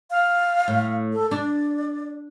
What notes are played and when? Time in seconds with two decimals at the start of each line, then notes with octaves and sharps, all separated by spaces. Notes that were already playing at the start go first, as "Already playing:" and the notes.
0.11 F5
0.68 A2
1.13 A4
1.31 D4 D5